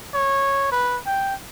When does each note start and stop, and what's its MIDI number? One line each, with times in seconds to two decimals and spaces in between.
0.14 0.68 73
0.72 0.97 71
1.07 1.35 79